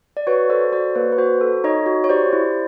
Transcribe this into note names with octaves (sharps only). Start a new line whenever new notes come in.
D5
F#4 B4 C#5
A4 C5 D5
F#4 C5 D5
A#3 B4 C#5
B4
F#4 C5
A4
D#4 C#5 D#5
F#4
C#5
G4 C5 D5
E4